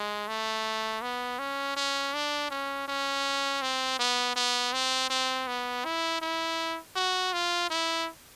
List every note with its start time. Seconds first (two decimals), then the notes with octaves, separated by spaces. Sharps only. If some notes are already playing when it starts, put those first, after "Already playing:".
Already playing: G#3
0.28 A3
1.02 B3
1.39 C#4
1.77 C#4
2.14 D4
2.51 C#4
2.88 C#4
3.62 C4
3.99 B3
4.36 B3
4.73 C4
5.10 C4
5.47 B3
5.85 E4
6.22 E4
6.96 F#4
7.33 F4
7.70 E4